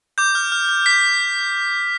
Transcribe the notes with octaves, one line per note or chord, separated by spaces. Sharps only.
D6 G6
F6
F6
F6
G6 B6